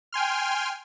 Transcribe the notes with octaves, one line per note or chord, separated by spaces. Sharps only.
G5 G#5 C6 F6